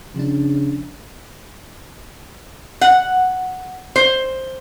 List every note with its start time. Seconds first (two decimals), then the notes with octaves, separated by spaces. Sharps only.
0.15 C#3 F3 D4
2.81 F#5
3.96 C5